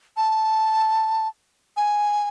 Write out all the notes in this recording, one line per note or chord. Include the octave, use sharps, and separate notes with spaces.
A5
G#5